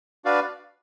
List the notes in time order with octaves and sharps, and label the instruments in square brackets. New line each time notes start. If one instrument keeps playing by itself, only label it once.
[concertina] D4 F#4 B4 D5 F5